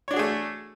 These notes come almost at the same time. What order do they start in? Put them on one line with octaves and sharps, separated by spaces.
C#5 D4 F#4 G#4 A3